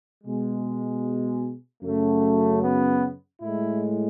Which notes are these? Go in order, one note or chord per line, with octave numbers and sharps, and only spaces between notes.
B2 G#3
F#2 C#3 F#3 A3
B3
A2 G#3 E4